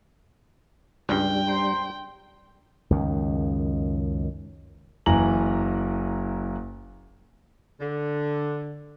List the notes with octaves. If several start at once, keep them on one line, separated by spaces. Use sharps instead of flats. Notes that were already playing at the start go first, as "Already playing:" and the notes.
C#2 G2 G3 D4 G5
C5 A#5 C6
C#2 F#2 D#3
F#1 E3 A#5 F#7
D3